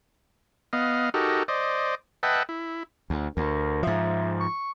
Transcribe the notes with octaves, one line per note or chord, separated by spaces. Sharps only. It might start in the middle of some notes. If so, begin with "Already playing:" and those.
B3 D#5 F5
D#4 F#4 G4 A4 A#4
C5 D5 D#5
B4 D#5 E5 F#5 G5 A5
E4
D2
D2 A#4
G#2 F3 E5
C#6